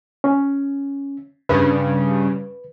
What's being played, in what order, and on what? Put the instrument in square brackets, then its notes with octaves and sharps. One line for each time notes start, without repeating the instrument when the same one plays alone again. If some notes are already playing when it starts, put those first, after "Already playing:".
[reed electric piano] C#4
[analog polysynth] G2 C#3 [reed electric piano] B4